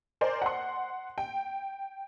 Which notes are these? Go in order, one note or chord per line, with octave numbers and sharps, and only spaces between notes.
A#4 C5 D5 G#5
F#5 C6
G5